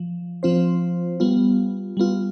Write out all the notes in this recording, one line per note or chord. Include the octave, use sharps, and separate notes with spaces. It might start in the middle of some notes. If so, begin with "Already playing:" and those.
Already playing: F3
F3 C4 F4 C5
G3 B3 F4
G3 B3 F4